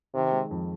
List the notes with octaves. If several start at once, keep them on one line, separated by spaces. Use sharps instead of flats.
C3 D#3
G#3
F2